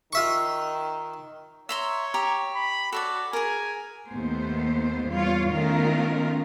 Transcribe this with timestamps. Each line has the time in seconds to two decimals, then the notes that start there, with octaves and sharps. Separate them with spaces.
0.13 D#3 F4 E5 C#6
1.69 C#5 E5 A#5 C6
2.14 G4 A#5
2.56 B5
2.92 F#4 A4 C#5 D5
3.33 G#4 A#4 G#5
4.08 D#2 A3 B3 C5
5.08 E2 G3 F4 C#5
5.52 D#3 A3 B3 C#4 F4 A#4